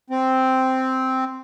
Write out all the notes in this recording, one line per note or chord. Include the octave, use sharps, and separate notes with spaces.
C4